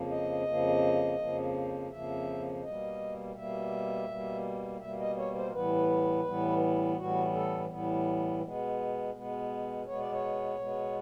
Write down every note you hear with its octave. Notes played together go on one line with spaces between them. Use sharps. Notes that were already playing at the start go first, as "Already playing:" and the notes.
Already playing: F2 C#3 F3 A#3
D#5
F2 C#3 F3 A#3
F2 C#3 F3 A#3
F2 C#3 F3 A#3 E5
B2 G3 A#3 D#5
B2 G3 A#3 E5
B2 G3 A#3
B2 G3 A#3 E5
D#5
C#5
C5
A#4
A2 E3 G3 B3 B4
A2 E3 G3 B3
A2 E3 G3 B3 F#4
A4
A2 E3 G3 B3
B2 G#3 B3
B2 G#3 B3
B2 G#3 B3 C#5
D5
C#5
B2 G#3 B3